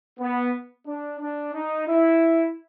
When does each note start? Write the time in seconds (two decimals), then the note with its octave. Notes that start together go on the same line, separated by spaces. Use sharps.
0.20 B3
0.87 D4
1.20 D4
1.54 D#4
1.88 E4